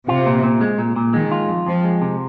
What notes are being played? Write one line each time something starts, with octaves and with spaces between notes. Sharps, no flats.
C3 F4
A#2
A#2
G#3
A#2
A#2
D#3 G#3
F4
F2
F2 F3
G#3
C3